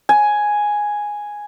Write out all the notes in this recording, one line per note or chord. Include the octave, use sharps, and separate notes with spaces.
G#5